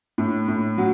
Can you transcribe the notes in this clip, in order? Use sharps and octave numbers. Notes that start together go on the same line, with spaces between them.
A2
A2
F#3